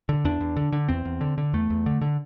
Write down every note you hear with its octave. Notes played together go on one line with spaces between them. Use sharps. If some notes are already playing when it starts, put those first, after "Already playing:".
D3
E2 D4
E2
D3
D3
E2 C4
E2
D3
D3
E2 A3
E2
D3
D3